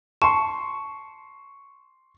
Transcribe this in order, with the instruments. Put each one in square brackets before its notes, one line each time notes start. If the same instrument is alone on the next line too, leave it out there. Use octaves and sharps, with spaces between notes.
[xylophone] A5 [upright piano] C6 C#6